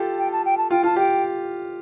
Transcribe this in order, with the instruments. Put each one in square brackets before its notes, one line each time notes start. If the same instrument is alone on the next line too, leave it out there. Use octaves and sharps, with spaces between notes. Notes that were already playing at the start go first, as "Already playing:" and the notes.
Already playing: [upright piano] F4 G4 A4
[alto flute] G5
A5
G5
A5
[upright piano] F4 [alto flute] G5
[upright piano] F4 [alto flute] A5
[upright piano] G4 [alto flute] G5